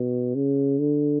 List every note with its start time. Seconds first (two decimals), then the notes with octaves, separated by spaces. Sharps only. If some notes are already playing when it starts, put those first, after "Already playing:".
Already playing: B2
0.35 C#3
0.79 D3